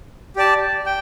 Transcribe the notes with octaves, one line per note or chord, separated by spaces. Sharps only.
G4 D5 A5
G5